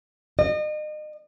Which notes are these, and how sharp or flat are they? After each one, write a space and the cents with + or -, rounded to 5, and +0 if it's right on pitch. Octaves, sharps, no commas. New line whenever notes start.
D#5 -35